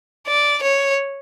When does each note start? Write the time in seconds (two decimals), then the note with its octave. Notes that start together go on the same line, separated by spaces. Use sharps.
0.27 D5
0.62 C#5